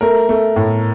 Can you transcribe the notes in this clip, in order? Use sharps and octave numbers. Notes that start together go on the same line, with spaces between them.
A3 A#4
A3
A2